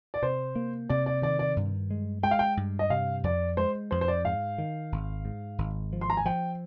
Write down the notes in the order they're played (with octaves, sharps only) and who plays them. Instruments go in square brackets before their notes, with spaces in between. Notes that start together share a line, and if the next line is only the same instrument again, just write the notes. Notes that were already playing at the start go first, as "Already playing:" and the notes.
[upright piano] D5
[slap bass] C3 [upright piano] C5
[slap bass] A#3
[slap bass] C3 [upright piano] D5
[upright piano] D5
[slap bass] D#3 [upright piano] D5
[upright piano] D5
[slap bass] G2
G#3
[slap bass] G#3 [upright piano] G5
[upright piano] F5
G5
[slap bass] G2
[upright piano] D#5
[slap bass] C3 [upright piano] F5
[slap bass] F2 [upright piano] D5
[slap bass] G#3 [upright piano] C5
[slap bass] F2 [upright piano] C5
[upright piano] C5
D5
[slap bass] G#2 [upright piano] F5
[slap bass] D#3
G#1
G#2
G#1
F3
[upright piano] C6
A#5
G#5
[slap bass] F3 [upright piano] G5